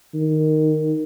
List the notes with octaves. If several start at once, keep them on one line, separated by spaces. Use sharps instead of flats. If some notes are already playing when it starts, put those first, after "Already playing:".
D#3